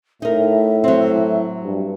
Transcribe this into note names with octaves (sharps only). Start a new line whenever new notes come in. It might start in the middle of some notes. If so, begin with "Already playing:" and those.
A2 D#4 A#4 E5
F#3 C4
G2